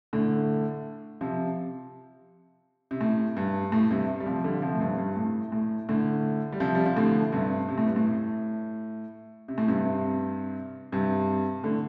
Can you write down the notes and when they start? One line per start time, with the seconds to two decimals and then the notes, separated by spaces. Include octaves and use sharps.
0.13 A2 D3
1.21 C3 F3
2.91 C3
3.01 A2
3.37 G2
3.72 A2
3.90 G2 C3
4.20 G3
4.27 C3 F3
4.44 D3 G3
4.62 C3 F3
4.74 A2
4.80 G2 C3
4.98 G2
5.16 A2
5.52 A2
5.89 A2 D3
6.52 G3
6.60 C3 F3
6.75 G3
6.86 F3
6.96 A2 D3
7.32 G2 C3
7.69 C3
7.78 A2
7.86 G2
7.96 A2
9.48 C3
9.58 A2
9.68 G2 C3
10.92 G2 C3
11.64 A2 D3